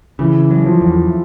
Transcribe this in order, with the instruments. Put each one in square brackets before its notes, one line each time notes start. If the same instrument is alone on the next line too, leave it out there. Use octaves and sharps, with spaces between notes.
[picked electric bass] C#3 [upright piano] E3
[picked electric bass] F#3
[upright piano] F3
[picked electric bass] E2